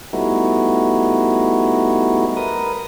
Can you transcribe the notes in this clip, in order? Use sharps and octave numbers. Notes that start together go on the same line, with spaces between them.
G3 A3 B3 D#4 E4 F#4
A#4 B4 D#6